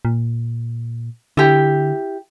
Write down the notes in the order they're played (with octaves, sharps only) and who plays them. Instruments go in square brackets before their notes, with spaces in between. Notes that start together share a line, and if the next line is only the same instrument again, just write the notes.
[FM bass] A#2
[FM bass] D3 [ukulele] E4 G4